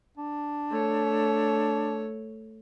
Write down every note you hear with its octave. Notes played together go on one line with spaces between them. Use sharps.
D4
A3 C#5